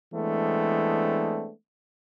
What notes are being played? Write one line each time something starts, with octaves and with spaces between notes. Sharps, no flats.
E3 G#3 A3 B3 C4 D4